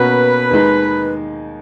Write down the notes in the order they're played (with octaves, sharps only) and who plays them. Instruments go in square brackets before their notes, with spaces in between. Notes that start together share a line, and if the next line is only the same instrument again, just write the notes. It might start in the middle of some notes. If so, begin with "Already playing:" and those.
Already playing: [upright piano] B2 A#3 C#4 F#4 A#4 [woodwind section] B4
[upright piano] D#2 D#3 G#3 D#4